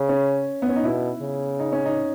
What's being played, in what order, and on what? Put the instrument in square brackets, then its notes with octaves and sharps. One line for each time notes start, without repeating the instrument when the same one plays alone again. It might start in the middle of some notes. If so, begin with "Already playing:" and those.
Already playing: [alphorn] C#3
[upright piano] C#4
B3
C#4
D#4
[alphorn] B2 [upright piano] E4
[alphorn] C#3
[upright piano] D#4
C#4
D#4